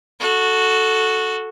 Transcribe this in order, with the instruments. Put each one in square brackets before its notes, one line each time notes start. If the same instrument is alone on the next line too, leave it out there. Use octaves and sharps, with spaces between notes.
[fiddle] F#4 A4